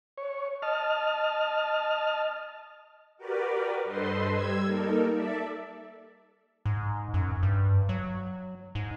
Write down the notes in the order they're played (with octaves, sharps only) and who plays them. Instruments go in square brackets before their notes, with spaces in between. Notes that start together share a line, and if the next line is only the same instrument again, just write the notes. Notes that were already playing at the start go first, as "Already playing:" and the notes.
[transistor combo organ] C#5
D#5 A5 F6
[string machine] F#4 G4 A#4 B4 D5
G2 A4 B4 C5 D#5 C6
G3 E6 G#6
G3 A#3 D#4 A4 A#4
A4 D5 E5
[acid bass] G#2
F#2
G2
F#3
G#2